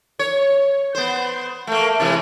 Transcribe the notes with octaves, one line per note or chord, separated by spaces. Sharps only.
C#5
B3 C5
A3 A#3
C3 E3 G#3